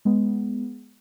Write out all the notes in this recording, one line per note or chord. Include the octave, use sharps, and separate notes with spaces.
G#3 B3